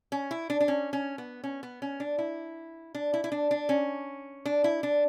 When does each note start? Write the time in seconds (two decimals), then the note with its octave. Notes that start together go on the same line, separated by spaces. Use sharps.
0.12 C#4
0.31 E4
0.50 D4
0.61 D4
0.68 C#4
0.93 C#4
1.18 B3
1.44 C#4
1.63 B3
1.82 C#4
2.00 D4
2.19 E4
2.95 D4
3.14 E4
3.24 E4
3.32 D4
3.51 D4
3.69 C#4
4.46 D4
4.64 E4
4.83 D4